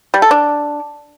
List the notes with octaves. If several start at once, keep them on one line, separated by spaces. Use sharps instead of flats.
G3
A4
D4